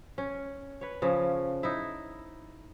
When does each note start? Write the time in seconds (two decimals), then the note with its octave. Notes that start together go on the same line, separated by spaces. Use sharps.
0.18 C#4
0.81 B4 C#5
1.02 C#3 F3 C#4
1.63 D#4 E4